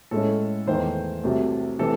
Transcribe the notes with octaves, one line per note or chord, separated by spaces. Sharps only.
A2 G#3 C#4 A4
E2 D#3 A3 C5
C2 C3 F#3 A3
C3 E3 A3 A4